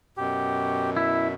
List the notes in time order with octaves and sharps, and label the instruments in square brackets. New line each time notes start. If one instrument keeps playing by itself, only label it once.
[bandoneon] F#2 B2 [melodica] G4
[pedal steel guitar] E4 [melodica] E5